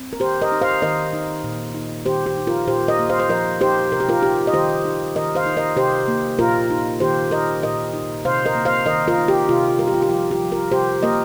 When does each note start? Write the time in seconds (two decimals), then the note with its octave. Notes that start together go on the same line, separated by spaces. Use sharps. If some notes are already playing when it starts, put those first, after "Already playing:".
Already playing: C4
0.13 A#4
0.20 D#3 G4 C5
0.42 A#4 D#5
0.52 D#4
0.62 C5 F5
0.82 D#3 A#4 D#5
1.13 D#4
1.44 A#2
1.75 D#4
2.06 D#3 G4 C5
2.26 G4
2.37 D#4
2.47 F4 A#4
2.68 A#2 G4 C5
2.88 A#4 D#5
3.00 A#3
3.09 C5 F5
3.20 C5
3.30 F3 A#4 D#5
3.61 D#4 G4 C5
3.92 C3 A#4
4.00 G4
4.09 F4 A#4
4.22 D#4 G4
4.47 D#5
4.53 D#3 G4 C5
4.85 D#4
5.15 D#3 A#4 D#5
5.35 C5 F5
5.46 D#4
5.57 A#4 D#5
5.77 C3 G4 C5
6.08 A#3
6.39 A#2 F4 A#4
6.71 D#4
7.00 D#3 G4 C5
7.31 D#4 A#4 D#5
7.63 A#2 A#4 D#5
7.93 D#4
8.25 C3 C5 F5
8.45 A#4 D#5
8.55 A#3
8.65 C5 F5
8.86 D#3 A#4 D#5
9.08 F4 A#4
9.18 D#4
9.28 G4
9.49 C3 F4
9.79 G3 A#4
9.88 G4
9.94 F4
10.02 G4
10.10 F3 F4
10.31 G4
10.42 F3
10.52 F4 A#4
10.71 C3 G4 C5
11.03 A#3 A#4 D#5